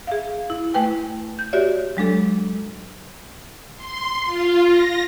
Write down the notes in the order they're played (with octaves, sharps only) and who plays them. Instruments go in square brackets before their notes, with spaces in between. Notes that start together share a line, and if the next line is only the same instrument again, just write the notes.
[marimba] G#4 E5 F5
E4
A3 E4 B4 G5 G#5
G6
F#4 G4 C#5 D5 E5
F#3 G#3 D4 A4
[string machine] C6
F4
A#6